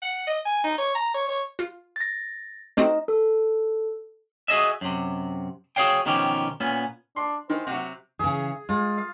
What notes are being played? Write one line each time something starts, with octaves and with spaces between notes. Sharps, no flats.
F#5
D#5
G#5
D#4
C#5
A#5
C#5
C#5
F4
A6 A#6
A3 C4 D#4 F#4 D#5
A4
F#4 G#4 D#5 E5
F#2 C3
F#4 G#4 B4 C#5 F5 G5
B2 D#3 F3 C#4 G4
A#2 B3 C#4
D4 C6
D#3 E3 C5
C3 F#3 F#5
C#3 E3 G#4
G#3 F4
F5